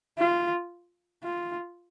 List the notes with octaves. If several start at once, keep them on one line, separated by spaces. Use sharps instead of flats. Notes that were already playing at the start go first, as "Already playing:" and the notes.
F4
F4